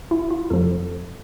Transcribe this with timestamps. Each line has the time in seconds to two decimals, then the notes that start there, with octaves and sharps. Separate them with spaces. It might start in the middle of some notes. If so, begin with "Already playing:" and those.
0.11 E4
0.31 F4
0.50 F2 C3 F3 A4